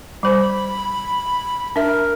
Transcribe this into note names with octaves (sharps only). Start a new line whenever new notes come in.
G3 C5 B5
D4 A#4 E5